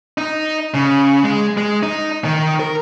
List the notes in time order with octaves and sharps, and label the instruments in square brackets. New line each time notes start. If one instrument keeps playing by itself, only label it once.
[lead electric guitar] D#4
C#3
G#3
G#3
D#4
D#3
A#4